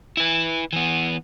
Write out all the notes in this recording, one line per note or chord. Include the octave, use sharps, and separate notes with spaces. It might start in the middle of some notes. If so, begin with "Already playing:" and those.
E4 B4
E3 B3